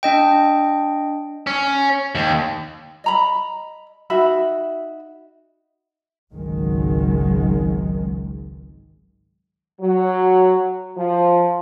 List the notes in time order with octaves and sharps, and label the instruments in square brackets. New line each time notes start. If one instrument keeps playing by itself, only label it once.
[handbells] D4 D#5 G5
[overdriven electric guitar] C#4
D#2
[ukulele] D#5 A#5 B5
D#4 F#4 E5 B5
[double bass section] G#1 C#2 D#3 F#3 G#3
[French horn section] F#3
F3